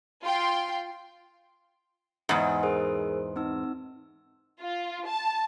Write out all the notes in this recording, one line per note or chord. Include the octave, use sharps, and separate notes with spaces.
F4 G5 C6
E2 G#2 D#5 F#5 G#5
G#4 A#4 C5
C4 D#4 E6
F4
A5